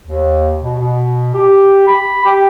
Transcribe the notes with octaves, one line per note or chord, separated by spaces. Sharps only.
D#2
B2
B2
G4
B5
G4